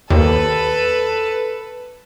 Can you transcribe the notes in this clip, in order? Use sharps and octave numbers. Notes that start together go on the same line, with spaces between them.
D#2 A4 B4